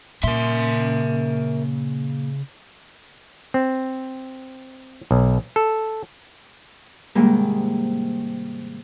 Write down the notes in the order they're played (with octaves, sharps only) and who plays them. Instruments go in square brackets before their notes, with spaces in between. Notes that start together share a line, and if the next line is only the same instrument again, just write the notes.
[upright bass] A#2 [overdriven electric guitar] C#3 C6 [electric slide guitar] A#4 E5
[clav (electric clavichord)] C4
B1
A4
[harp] G#2 C3 D#3 G3 G#3 A#3